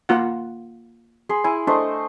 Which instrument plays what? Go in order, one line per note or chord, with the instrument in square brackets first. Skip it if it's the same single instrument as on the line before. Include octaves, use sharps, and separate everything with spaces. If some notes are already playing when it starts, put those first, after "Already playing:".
[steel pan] A#3 F4 F#5
[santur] G#4 B5 C6
[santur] E4 [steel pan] G#5
[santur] A3 C5 D#5 [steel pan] D4